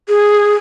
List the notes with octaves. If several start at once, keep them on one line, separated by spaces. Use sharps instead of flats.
G#4